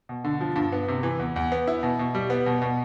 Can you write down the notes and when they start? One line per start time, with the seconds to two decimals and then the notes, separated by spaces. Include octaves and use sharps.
0.09 B2
0.24 D3
0.41 F3
0.56 G2
0.72 B3
0.88 C3
1.03 E3
1.19 E2
1.36 E2
1.52 B3
1.67 E4
1.83 B2
1.99 B2
2.15 G3
2.30 B3
2.46 B2
2.62 B2